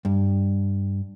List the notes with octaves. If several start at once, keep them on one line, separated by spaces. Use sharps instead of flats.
G2